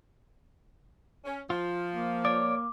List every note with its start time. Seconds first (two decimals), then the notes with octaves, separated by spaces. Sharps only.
1.25 C#4
1.50 F3 F4
1.93 A#3
2.25 C#5 D5 D6